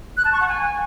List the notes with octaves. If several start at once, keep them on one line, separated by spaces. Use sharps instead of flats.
F#6
A5
C#6
F#5
G#5